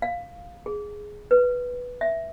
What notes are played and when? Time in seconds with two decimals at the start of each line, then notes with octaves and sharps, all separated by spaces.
0.02 F5
0.66 G#4
1.31 B4
2.01 E5